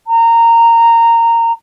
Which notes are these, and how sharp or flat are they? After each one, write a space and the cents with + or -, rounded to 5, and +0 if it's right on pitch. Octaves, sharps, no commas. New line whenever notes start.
A#5 -15